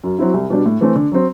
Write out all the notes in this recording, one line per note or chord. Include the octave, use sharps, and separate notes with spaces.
F#2
F#3 C4 E4
C2
B2 G3 D4
A2
E3 A3 C4
D3
F#3 C4